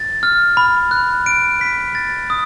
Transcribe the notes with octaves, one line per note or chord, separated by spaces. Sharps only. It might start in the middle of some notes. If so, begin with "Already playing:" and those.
Already playing: A6
F6
B5
F#6
D7
B6
A6
D#6